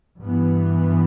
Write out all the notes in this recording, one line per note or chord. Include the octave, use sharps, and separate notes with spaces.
G2 E3 B3